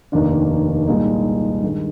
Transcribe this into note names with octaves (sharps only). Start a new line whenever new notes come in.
F1 D#2 D#3 A#3 D4
C2 A#2 G#3 D#4
G2 D#3 G#3